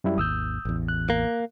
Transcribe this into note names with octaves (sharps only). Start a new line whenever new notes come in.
F#2 G3 E4
G#1 D#2 D#6 E6 G6
A1 E2
F#6
A#3